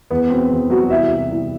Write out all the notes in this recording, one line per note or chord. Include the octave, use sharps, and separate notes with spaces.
E2 B3
B2 C4
E2
F#3 G3 F#4
C2 E4 E5
C3
C2